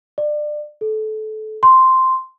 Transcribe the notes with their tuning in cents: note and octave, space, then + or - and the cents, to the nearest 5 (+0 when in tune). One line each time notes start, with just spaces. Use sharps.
D5 +25
A4 -25
C6 -5